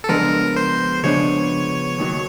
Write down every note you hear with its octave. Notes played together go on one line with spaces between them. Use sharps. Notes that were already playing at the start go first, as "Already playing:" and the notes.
A4
C#3 F3 G#3 B3 D4 A#4
C5
C#3 F3 G#3 B3 D4 C#5
D#2 D#3 F#3